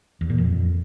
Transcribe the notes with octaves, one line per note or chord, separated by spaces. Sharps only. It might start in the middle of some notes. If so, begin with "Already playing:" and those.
E2
A#2
F2